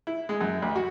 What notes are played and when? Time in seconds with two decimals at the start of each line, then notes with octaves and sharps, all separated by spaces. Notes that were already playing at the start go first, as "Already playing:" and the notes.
0.07 E4
0.29 G#3
0.41 F#2
0.62 D2
0.75 F#4